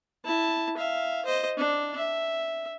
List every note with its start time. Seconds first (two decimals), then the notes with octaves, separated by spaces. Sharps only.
0.25 E4 A5
0.77 E5 F5
1.25 C5 D#5
1.57 D4
1.97 E5